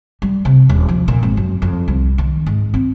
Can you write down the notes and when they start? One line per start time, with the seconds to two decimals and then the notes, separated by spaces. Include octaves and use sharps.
0.22 G3
0.45 C3
0.69 D#1
0.88 F3
1.08 A#2
1.23 G#1
1.37 F#2
1.62 F2
1.88 C2
2.18 D#3
2.46 G#2
2.74 C4